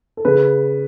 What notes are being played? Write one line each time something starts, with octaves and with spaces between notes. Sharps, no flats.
A4
C#3 B4